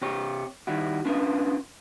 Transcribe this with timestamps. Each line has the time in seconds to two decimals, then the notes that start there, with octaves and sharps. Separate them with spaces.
0.02 C3 G4 C#5
0.67 D#3 G3 E4 F#4
1.05 B3 C#4 D4 F4 A#4 B4